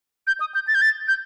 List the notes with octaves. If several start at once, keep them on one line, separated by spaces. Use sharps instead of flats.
G6
D#6
G6
A6
G6
A6
G6